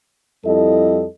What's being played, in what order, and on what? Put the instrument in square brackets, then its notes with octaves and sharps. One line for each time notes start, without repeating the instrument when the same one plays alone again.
[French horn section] F2 G3 E4 A4 D#5